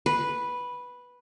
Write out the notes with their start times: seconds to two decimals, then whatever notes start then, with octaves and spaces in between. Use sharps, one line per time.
0.06 B4